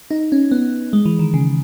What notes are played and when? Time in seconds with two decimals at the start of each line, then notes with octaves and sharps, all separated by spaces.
0.11 D#4
0.32 C#4
0.51 B3
0.93 G#3
1.05 E3
1.19 D#3
1.34 C#3